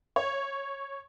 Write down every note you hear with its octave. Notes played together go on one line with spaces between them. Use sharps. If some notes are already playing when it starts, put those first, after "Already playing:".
C#5